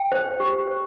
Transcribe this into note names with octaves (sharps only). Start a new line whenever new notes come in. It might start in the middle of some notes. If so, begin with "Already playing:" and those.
Already playing: G5
C5
G4
C5